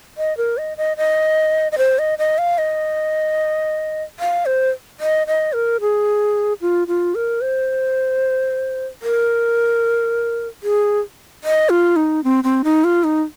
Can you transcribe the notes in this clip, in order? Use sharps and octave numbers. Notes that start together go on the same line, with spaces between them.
D#5
A#4
D#5
D#5
D#5
D#5
C5
D#5
D#5
F5
D#5
F5
C5
D#5
D#5
A#4
G#4
F4
F4
A#4
C5
A#4
G#4
D#5
F4
D#4
C4
C4
D#4
F4
D#4